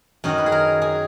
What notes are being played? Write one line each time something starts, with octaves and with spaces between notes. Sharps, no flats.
F#2 D#3 F#3 D#5
B4
G#4
A#4
G#4